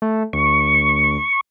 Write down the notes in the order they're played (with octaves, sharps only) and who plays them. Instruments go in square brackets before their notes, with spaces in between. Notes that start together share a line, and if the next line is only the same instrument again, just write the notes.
[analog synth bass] A3
[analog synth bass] D2 [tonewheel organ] C#6